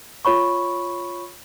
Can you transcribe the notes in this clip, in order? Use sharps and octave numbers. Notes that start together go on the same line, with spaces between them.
F4 C#5 B5 C#6